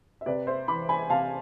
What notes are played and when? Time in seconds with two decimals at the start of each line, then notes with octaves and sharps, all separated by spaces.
0.21 E5
0.26 C3 B4 D5
0.47 C5 E5
0.68 E3 B5 D6
0.89 G#5 B5
1.10 C3 F5 A5